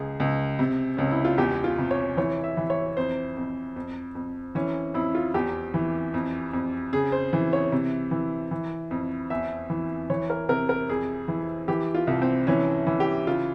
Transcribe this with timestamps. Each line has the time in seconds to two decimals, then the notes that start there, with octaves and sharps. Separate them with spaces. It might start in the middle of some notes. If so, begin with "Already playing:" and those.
Already playing: C#2 G#4
0.20 C#2
0.59 C3
0.97 C#2 C#4
1.11 E4
1.25 F4
1.38 E2 G4
1.64 F4
1.78 C3
1.91 C#5
2.17 E3 C#5
2.44 E5
2.57 E3
2.70 C#5
2.97 F2 C5
3.37 F2
3.76 F2
4.15 F2
4.55 E3 C#4
4.94 F2 E4
5.15 F4
5.34 E2 G4
5.74 E3
6.14 F2
6.53 F2
6.93 C#3 G#4
7.12 C5
7.33 E3
7.53 C#5
7.72 C3
8.11 E3
8.51 E3
8.91 F2
9.30 E2 E5
9.70 E3
10.10 E3 C#5
10.30 A#4
10.49 C3 A#4
10.69 A#4
10.89 F2 G#4
11.28 E3
11.68 E3 G4
11.95 F4
12.07 C2
12.22 C4
12.47 E3 C#4
12.87 E3
13.00 G4
13.27 C#3 F4